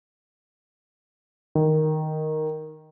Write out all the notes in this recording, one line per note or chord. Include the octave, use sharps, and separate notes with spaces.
D#3